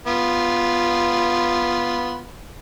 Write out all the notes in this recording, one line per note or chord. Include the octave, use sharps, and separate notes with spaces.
B3 F4